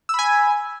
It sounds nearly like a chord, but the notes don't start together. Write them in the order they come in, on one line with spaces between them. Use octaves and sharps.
E6 B5 G#5